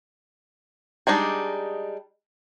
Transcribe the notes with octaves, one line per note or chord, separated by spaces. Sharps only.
G3 G#3 D4 D#4